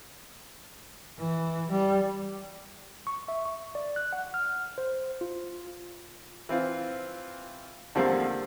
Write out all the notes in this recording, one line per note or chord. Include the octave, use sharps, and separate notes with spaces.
E3
G3
C#6
E5
C#6
D5
F#6
F#5
F6
C5
F4
E3 C4 F4
E2 D3 F3 G3 A#3 C4